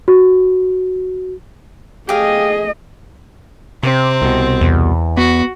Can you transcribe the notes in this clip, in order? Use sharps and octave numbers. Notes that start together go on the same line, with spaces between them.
F#4
A3 G4 G#4 D#5 F5
C3 C4
C2 B2
E2
B3 F#4